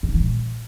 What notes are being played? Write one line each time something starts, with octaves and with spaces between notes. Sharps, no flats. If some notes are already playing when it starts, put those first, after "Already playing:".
G2
C3
E3
A#2